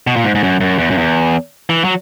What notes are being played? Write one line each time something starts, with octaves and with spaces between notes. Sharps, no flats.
B2
A#2
G#2
G#2
F#2
F#2
E2
F#2
E2
E3
F#3